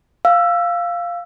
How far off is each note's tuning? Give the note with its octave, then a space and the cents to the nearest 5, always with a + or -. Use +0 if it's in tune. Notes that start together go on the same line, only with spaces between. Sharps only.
F5 +0 E6 +15